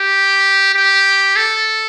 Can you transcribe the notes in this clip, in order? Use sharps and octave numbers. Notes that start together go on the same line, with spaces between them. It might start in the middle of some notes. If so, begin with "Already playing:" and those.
Already playing: G4
G4
A4